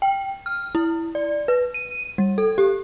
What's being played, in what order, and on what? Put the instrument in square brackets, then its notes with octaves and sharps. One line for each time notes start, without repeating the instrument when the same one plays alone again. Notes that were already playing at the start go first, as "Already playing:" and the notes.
[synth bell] G5
F6
E4
D5
B4
D#7
G3
A4
G4